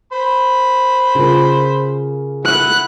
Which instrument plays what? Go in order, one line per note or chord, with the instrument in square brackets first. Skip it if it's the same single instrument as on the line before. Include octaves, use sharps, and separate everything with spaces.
[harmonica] C5 B5
[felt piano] C#3 F4 A#4
[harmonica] E4 F#5 [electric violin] F#6